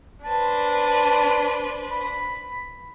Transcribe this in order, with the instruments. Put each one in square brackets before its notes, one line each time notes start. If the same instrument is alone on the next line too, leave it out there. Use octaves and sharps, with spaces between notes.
[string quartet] D4 B4 C5 [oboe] A5
[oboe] B5